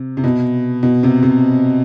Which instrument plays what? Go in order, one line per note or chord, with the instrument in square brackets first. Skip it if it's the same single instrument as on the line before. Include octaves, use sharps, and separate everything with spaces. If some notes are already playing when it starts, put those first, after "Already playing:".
Already playing: [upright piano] C3
C3
B2
B2
C3
C3